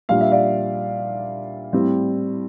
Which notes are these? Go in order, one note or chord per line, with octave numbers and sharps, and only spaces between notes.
A#2 G3 D4 F5
E5
D5 F5
A2 G3 C4